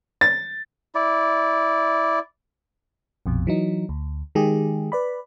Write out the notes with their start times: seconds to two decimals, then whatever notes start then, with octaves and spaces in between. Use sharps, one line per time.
0.21 A6
0.95 E4 D5
3.26 A#1 F2 B2
3.47 E3 F#3 D#4
3.89 D2
4.35 D#3 G#3 G4 G#4
4.92 B4 D5 B5